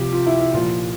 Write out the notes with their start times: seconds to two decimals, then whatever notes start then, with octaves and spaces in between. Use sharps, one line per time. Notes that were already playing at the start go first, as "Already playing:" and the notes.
Already playing: C3 F3 G4
0.13 F4
0.27 E4
0.40 E4
0.54 A#2 F3 F4